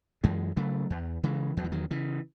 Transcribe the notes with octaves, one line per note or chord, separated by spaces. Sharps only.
F#2 E3 G#3
C#3 F#3 A3
E2
C#3 E3 G#3
E2 F#3
E3
D#3 F#3
C#3 E3